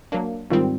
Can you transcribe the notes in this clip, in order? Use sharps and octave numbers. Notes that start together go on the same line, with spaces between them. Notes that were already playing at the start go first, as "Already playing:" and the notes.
F#3 A#3 D4
G#2 D#3 G3 C4 F4